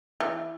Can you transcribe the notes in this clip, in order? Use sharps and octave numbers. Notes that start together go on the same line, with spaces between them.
E3